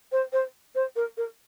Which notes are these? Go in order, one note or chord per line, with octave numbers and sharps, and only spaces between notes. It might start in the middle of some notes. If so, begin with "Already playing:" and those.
C5
C5
C5
A#4
A#4